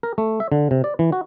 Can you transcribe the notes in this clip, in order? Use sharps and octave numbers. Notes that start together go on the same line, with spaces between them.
A#4
A3
E5
D3
C3
D5
E3
F#4